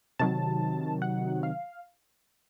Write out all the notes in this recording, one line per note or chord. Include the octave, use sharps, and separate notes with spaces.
C3 D#3 F#3 A5
F#5
F5